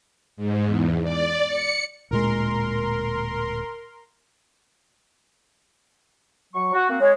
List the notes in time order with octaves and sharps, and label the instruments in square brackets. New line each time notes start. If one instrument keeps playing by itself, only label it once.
[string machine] G#2
E2
D5
C#7
[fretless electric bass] D1 A#2 G#3 [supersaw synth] A#4 C6
[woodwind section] F#3 C#6
F#4
A#3 C4 F#4
[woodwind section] G#3 [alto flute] C#5